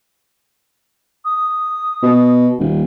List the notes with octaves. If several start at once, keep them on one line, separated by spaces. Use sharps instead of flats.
D#6
B2
D#1